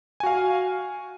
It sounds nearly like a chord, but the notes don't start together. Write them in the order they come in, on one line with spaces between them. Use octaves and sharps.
G#5 F#4 F5